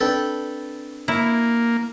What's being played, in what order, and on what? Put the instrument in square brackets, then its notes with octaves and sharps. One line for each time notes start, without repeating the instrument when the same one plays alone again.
[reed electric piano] C4 D4 [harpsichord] A4 B4 G5
[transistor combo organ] A#3 [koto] E4